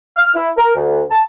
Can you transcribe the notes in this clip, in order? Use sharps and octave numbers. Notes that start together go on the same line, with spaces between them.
F6
E4
A#4
D2
A5